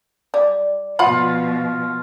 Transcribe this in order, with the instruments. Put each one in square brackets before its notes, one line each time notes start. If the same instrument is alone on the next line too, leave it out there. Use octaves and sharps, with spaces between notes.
[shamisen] G3 [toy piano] D5 D6
[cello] B2 F3 [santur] F4 [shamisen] F#5 B5